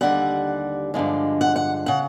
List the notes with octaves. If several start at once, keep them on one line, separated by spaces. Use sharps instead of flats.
D#2 D3 G3 F#5
G2 D3 F3 G#3
F#5
F#5
C#3 F#5